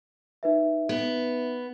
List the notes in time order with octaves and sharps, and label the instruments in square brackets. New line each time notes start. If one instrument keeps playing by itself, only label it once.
[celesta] D#4 B4 E5
[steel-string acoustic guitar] B3